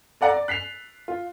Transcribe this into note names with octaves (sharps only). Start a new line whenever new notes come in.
A4 D5 F#5 A#5 A6
D5
F#6 B6 C7 F7
F4